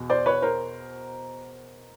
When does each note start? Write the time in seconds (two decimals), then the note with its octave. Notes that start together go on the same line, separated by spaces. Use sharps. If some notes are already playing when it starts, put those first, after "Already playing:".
Already playing: E2 B2
0.10 C5 D5
0.26 B4 C#5
0.42 A#4 C5